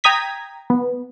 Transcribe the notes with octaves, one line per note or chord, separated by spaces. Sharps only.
G5 A#5 D#6 G#6 B6
B3